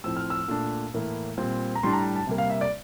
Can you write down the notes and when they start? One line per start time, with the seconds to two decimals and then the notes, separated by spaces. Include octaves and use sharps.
0.04 A2 F3 C4 E6
0.17 F6
0.30 E6
0.48 A#2 A3 D4
0.94 A2 E3 A#3 E4
1.38 A#2 G3 C4
1.75 A#5
1.83 A2 G3 D4 C6
1.93 A#5
2.16 A5
2.27 C3 G3 A#3
2.38 F5
2.50 E5
2.61 D5